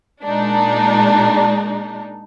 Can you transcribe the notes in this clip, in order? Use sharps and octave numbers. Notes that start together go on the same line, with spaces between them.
A#2 G#3 D4 D#4